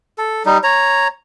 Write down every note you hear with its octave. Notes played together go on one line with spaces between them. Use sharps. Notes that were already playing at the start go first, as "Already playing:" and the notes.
A4
G3 D#4
C#5 A#5